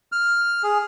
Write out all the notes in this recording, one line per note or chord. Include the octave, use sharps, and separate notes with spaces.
F6
G#4